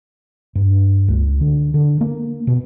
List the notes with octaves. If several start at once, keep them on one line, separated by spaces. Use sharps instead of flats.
G2
C#2
D3
D3
A#3
B2